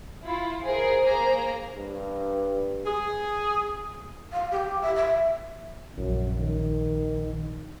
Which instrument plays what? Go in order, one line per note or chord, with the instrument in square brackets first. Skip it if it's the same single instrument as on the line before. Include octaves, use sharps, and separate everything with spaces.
[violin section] E4 F4
[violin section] G#4 A#4 [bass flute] C5
[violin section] A#3 G#4 A#5
[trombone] G2
[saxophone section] G#4
[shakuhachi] F5
G4
E5
E5
[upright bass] A#1 [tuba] F#2
[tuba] D#3